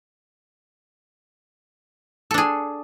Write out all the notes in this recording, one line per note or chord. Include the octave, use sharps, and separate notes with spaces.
D4 G#4 A4